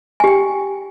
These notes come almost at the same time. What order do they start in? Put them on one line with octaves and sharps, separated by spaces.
G#5 G4 G5